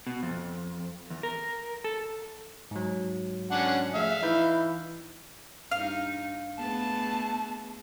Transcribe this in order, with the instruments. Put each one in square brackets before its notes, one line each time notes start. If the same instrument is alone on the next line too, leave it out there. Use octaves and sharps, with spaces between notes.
[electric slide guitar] B2
F2
E2
A#4
A4
[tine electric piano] G#2 F#3
[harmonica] C#4 D4 F#5
[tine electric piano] F3 A3 G#4 [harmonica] E5 F5
[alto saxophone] E3 [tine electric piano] D#4 B5 G6
[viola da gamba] G2 D#4 [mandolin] F5
[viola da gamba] A3 B3 G#4 [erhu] A5